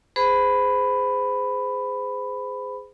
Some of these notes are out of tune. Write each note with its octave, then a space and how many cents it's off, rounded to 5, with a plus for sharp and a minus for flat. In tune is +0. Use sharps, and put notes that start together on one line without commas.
G#4 -10 C5 -30 B5 +10